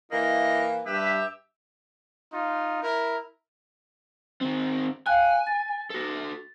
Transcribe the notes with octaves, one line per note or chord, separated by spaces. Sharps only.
E3 A#3 E4 D#5
G2 G4 B4 E5
D#4 F4
E4 A#4
D#3 C4
F5 G5 G#5 F#6
A6
F#4 A4